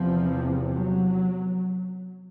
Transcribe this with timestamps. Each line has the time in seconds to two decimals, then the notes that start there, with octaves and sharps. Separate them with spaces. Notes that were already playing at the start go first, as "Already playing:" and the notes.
Already playing: E2 C3 F3
0.71 F#3